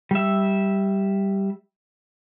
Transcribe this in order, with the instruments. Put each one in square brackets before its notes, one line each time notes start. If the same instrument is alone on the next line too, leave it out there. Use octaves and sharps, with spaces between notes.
[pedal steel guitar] G3 E5